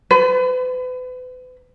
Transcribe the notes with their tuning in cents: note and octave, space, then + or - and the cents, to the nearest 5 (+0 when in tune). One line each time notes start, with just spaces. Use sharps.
B4 +40